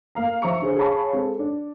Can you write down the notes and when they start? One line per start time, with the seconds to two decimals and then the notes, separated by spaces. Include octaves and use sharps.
0.15 A#3 F5 A#5
0.42 F3 C5 E5 A#5 C#6 C#7
0.62 D3 G#4 C5
0.77 G#4 C#5 F5 A5 B5 C#6
1.13 G#3 C4 A4
1.39 D4